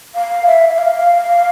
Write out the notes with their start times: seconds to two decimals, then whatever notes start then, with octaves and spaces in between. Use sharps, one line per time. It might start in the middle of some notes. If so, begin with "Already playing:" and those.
0.15 F5
0.47 E5
0.69 E5
0.78 F5